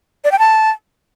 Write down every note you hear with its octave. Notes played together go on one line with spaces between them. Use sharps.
D5
G5
A5